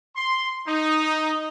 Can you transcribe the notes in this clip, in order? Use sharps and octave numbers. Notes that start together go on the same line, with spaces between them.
C6
D#4